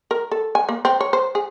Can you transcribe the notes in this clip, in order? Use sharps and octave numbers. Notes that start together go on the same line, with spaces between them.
A#4
A4
G#5
A#3
C4
C#5
C5
G#4